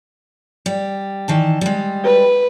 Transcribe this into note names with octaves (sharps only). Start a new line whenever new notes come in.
G3
D#3 E3 A5
G3 G#3
B4